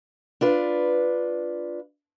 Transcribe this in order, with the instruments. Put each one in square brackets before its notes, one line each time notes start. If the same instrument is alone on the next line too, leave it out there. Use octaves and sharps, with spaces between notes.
[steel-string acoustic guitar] D4 F4 B4